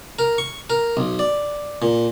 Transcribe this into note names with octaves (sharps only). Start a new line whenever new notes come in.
A#4
C#6
A#4
B1
D5
A#2